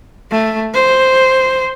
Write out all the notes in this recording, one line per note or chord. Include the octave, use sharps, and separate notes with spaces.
A3
C5